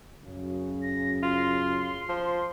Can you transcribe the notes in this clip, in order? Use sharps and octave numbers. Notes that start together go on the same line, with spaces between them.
F#2 C#3
A#6
F4 C6
F3